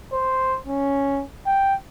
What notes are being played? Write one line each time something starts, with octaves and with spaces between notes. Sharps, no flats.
C5
C#4
G5